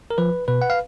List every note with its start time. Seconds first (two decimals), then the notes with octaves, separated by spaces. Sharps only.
0.11 A#4
0.18 F3 B4
0.48 B2 B4
0.62 F#5
0.70 F5